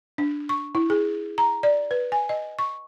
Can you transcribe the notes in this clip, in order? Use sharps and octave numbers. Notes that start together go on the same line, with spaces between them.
D4
C#6
E4
G#4
A#5
D5
B4
G#5
D#5
C#6